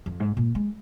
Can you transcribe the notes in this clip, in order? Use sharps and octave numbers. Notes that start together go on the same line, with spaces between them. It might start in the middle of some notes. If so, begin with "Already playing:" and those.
F2
G#2
A#2
G#3